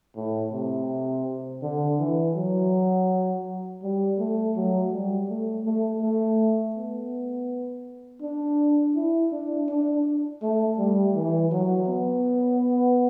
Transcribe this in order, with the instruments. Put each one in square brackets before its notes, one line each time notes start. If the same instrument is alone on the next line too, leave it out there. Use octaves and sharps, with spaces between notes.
[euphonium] A2
C3
D3
E3
F#3
G3
A3
F#3
G3
A3
A3
A3
B3
D4
E4
D4
D4
A3
G3
E3
F#3
B3